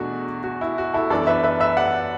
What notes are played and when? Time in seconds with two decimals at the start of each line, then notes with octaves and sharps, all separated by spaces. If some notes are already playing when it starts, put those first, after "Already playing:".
Already playing: E2 B2 A3 D4 F#4
0.44 F#4
0.61 E4
0.78 F#4
0.94 E4 A4
1.10 F#2 E3 B3 D4 A4 D5
1.27 B4 E5
1.43 B4 E5
1.60 B4 E5
1.77 D5 F#5